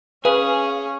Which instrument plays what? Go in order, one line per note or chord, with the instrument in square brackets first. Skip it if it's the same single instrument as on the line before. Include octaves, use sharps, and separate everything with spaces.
[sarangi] C#4 [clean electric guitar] G#4 [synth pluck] B4 [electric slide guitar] F5